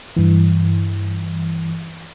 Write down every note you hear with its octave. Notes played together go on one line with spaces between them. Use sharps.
G2 E3